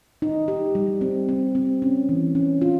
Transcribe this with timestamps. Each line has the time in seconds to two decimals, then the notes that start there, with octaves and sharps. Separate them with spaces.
0.22 D#4
0.48 G4
0.75 G3
1.01 C4
1.29 C4
1.55 C4
1.82 C#4
2.09 E3
2.35 C#4
2.61 F4